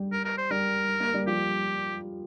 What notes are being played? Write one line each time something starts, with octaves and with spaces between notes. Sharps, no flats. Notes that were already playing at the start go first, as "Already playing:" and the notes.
Already playing: G3
A#4
A#4
C5
G3 A#4
A#3
G3
F3 G4